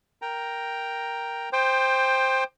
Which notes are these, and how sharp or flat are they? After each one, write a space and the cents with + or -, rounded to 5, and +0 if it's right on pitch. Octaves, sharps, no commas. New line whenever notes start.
A#4 +0 G5 +0 A#5 +0
C5 +5 G5 +20 D6 +40